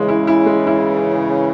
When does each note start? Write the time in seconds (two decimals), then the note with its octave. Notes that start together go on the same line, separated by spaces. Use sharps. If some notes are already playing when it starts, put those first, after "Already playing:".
Already playing: C#3 E3 G#3
0.08 E4
0.27 E4
0.46 G#3
0.67 E4